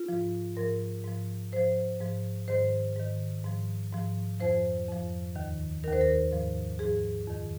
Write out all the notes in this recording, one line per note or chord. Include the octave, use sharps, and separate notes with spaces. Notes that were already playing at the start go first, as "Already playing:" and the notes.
Already playing: F4
G#2 F3
G#2 F3 A#4
G#2 F3
G#2 F3 C5
G#2 F3
G#2 D#3 C5
G#2 D#3
G#2 F3
G#2 F3
F2 F3 C5
F2 F3
D#2 D#3
D#2 D#3 A#4
C5
A#4
G#2 F3
G#2 F3 G#4
F2 D#3